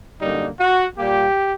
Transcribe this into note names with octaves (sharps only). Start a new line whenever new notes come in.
F#2 D3 G3 A#3 D#4
F#4
A#2 G3 A#3 G4